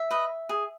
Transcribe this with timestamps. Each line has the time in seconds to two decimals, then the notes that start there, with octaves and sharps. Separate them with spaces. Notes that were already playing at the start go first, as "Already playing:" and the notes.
Already playing: E5
0.11 B4 D#5
0.49 G#4